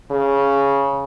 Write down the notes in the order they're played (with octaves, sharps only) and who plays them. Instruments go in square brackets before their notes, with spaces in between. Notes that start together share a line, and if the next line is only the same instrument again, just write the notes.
[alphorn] C#3